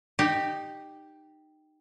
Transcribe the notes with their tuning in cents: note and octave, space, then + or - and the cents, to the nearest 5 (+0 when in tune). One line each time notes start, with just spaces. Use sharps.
D#4 -20 G4 +0